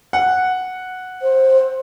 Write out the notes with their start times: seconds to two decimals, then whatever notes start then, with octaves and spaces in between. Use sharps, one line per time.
0.13 F#5
1.22 C5